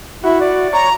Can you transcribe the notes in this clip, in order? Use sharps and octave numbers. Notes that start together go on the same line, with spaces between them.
E4 F#4
D5
C#5 A#5